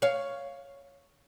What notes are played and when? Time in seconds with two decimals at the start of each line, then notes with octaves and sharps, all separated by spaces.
0.02 C#5 F5